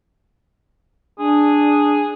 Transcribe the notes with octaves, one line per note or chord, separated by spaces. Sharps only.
D4 G#4